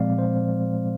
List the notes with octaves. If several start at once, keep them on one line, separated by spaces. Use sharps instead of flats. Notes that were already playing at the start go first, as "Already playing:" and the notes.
Already playing: A#2 F3 G#3 C4 D5 F5
C5